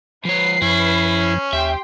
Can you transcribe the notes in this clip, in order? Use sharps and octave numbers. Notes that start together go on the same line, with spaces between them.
F3 B4 C#5 C7
F#2 F3 C#4 E4 G#6
D#2 G4 E5 G5 C6